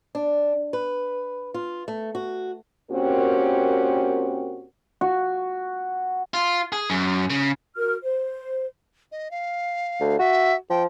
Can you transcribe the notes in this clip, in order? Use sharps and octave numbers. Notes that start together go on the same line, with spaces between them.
D4
B4
F4
A3
F#4
A#2 C4 C#4 F#4 G4 A#4
F#4
F4
G#4
F#2
C#3
F#4 A#4 F6
C5
D#5
F5
D2
F#4 E5
F3 G5